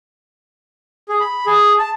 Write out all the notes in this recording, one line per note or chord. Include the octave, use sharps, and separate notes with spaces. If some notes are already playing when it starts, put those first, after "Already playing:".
G#4
B5
G#4
A5